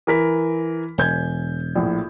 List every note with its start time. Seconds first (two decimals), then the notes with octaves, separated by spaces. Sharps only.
0.07 E3 A#4 B6
0.98 E1 G#5 G6 G#6
1.75 A#1 A2